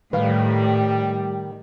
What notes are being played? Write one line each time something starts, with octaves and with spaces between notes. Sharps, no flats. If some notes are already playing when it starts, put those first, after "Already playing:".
A2 D#3 G3 B4 F5